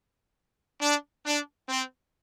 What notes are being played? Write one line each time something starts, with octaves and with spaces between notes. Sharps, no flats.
D4
D4
C4